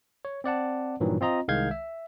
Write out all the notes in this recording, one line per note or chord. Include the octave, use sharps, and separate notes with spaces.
C#5
C4 D5 F#5 A5
G2 A#2 D#3 E3 F#3
C4 F4 D#5 A#5
C2 D#3 G#3 F5 G6 G#6
E5